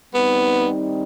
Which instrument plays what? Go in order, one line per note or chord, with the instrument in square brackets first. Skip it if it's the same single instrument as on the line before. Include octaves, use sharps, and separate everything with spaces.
[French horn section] D#3 G3 C4 D#4 [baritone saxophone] B3